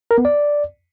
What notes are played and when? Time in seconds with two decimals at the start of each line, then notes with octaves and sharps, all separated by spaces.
0.11 A#4
0.18 B3
0.25 D5